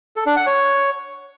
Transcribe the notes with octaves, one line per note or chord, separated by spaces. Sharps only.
A4
D4
F#5
C#5